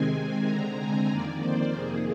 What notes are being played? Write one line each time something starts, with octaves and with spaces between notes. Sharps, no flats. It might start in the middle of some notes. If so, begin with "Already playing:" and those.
Already playing: C3 D#3 G#3 C4 G#5
D3 G#3 C4 A#5
G#5
F2 D#3 A#3 D5
C5
F2 C3 D#3 A#3 G#4